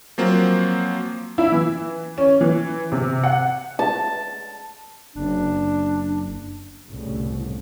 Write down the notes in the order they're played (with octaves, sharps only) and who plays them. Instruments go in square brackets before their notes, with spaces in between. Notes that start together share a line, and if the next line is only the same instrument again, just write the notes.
[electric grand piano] F3 F#3 A#3 C4
[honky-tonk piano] E4
E3
C#4
E3
C3
F#5
[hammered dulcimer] A5
[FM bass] F#1 [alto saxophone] D4
[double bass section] G1 C2 A2 C#3